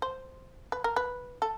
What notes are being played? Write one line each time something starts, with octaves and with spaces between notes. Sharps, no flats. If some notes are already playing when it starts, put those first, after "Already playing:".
C5
B4
A#4
B4
A4